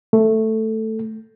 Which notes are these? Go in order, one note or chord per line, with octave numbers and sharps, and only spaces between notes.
A3